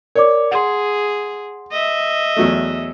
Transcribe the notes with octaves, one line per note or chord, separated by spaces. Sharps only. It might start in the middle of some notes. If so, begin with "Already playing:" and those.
A#4 C#5 D5 D6
G#4 F#5 C6
D#5 E5
E2 F#3 A3